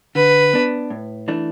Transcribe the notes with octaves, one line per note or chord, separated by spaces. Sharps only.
D3 B4
B3 D4
A2
E3 A3 D4